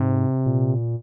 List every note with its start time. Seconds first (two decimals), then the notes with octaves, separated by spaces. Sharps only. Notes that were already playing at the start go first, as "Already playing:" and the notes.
Already playing: G#2 C3
0.46 A#2